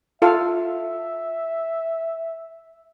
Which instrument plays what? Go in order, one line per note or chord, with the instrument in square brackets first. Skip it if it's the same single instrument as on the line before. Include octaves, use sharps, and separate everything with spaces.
[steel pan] F4 A4 F5 [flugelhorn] E5